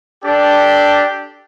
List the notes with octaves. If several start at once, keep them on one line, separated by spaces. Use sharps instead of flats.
D4 G4 A4 D5